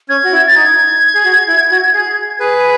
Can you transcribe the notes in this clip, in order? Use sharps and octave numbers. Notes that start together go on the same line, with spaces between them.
C#4 G#6
F#4
E4
A6
D#4 G#6
G#4
F#4
E4
F#4
G#4
G#4 B4